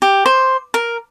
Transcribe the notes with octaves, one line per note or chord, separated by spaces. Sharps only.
G4
C5
A#4